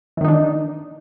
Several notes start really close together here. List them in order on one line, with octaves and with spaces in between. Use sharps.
E3 D#3 D#4 D4